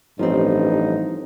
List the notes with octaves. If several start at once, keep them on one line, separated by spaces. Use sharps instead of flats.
A1 G2 F3 C4 D#4